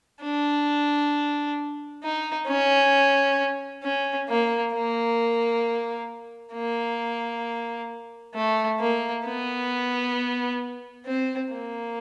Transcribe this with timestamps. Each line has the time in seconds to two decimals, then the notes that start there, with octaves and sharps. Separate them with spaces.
0.23 D4
2.03 D#4
2.48 C#4
3.84 C#4
4.29 A#3
4.74 A#3
6.54 A#3
8.35 A3
8.80 A#3
9.26 B3
11.06 C4
11.52 A#3